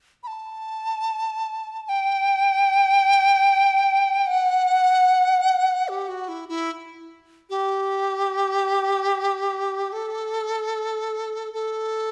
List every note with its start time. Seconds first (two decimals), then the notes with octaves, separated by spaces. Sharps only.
0.23 B5
0.27 A5
1.85 A5
1.89 G5
4.27 F#5
5.88 G4
6.09 F#4
6.28 E4
6.49 E4
7.50 G4
9.92 A4
11.53 A4